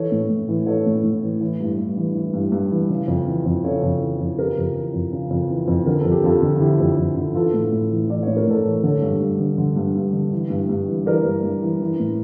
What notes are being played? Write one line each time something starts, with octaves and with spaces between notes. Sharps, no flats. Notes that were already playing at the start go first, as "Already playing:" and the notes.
Already playing: E3 A4 C#5
A2
A2
E3
E3 A4 C#5
A2
A2
E3
E3
G2
G2
E3
E3
G2
G2
E3
C#3
F2
E3
F2
C#3 A4 C#5
F2
E3
F2
C#3 G4 A#4
F2
E3
F2
C#3
F2
E3
F2
D3 A#4
A4
F2
G4
F2 F4 A4
D3
D3 E4 G4
F2
F2
D3
E3 F4 A4
A2
A2
E3
E3 D5
A2 C#5
A#4
A2 A4 C#5
E3
D3 A4 C#5
G2
G2
D3
D3
G2
G2
D3
E3
G2
G2
E3
E3 A#4 D5
G2
G2
E3
E3
A2